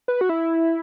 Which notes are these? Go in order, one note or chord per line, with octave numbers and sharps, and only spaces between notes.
B4
F#4
E4